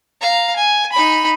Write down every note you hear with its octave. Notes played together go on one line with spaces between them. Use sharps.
F5 A#5
G#5
D#4 B5